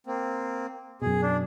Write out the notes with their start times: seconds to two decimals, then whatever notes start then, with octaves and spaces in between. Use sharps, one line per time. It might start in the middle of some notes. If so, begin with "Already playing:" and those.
0.07 A#3 C4
1.02 F#2 B2 G#4
1.22 D4